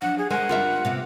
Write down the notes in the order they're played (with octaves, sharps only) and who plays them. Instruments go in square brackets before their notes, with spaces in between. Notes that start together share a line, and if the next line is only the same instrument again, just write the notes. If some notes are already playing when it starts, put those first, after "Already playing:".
[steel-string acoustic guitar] F3 F#3 D4 [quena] F#5
[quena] G#4
[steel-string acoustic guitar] G#3 [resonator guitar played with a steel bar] A#4 C5 G#5 [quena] F#5
[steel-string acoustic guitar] G2 G3 A#3 [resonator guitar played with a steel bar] F4 A#4 E5
[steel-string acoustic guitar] C3 A#3 B3